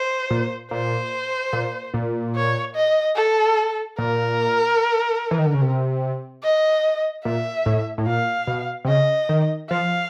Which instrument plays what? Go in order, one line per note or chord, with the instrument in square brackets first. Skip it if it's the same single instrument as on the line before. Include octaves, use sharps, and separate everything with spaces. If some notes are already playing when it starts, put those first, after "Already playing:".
Already playing: [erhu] C5
[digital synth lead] A#2
[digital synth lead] A#2 [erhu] C5
[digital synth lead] A#2
A#2
[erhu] C#5
D#5
A4
[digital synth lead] A#2 [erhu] A#4
[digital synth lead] E3
D#3
D3
C#3
C3
[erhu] D#5
[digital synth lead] A#2 [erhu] E5
[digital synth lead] A2
A2
[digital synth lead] A#2 [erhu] F5
[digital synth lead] B2
C3
[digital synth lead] C#3 [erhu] D#5
[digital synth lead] D#3
[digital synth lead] F3 [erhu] F5